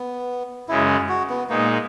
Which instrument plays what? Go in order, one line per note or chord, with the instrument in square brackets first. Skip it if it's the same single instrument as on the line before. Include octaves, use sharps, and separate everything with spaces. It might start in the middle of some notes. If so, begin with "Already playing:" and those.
Already playing: [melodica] B3
[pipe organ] F#2 C#3 G#3 [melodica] E4
[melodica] G#4
F#4
B3
[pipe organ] A#2 G#3 D#4 [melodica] A#3